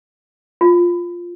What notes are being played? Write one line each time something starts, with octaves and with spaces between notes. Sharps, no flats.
F4